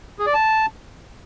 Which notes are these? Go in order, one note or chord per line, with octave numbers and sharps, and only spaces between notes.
G#4
D5
A5